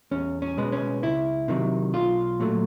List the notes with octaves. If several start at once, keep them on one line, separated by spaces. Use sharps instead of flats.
E2 C#4
C#4
B2 G#3 B3
C#4
C#2 E4
C3 D#3 F#3
B1 F4
A#2 F#3 A3